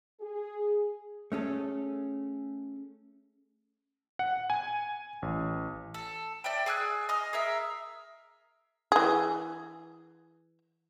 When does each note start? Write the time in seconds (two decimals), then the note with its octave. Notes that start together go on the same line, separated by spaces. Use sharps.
0.21 G#4
1.32 A3 C#4 G#4 A4
4.19 F#5
4.50 G#5
5.22 A1
5.94 A4
6.44 D5 E5 G5
6.66 G#4 G#5 E6 F#6
7.09 D#5 D#6 F6
7.33 G#4 A#4 E5
8.92 E3 G#4